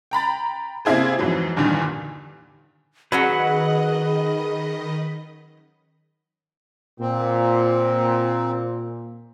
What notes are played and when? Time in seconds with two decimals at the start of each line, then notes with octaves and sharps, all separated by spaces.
0.11 G5 A#5 B5 A6
0.85 C3 A#3 C4 E4 G#4 C5
1.19 F2 G#2 E3 F#3
1.56 E2 G2 A#2 D3 D#3
3.12 D#3 F#3 C#4 G#4 B4 D#5 F#5
7.00 A#2 C4